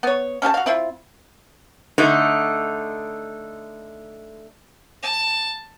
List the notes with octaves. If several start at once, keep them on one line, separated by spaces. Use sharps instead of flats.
B3 C#5
C#4 G4 F5 A5
F#4 F5
C4 E4 F4
D3 A3 D#4
A5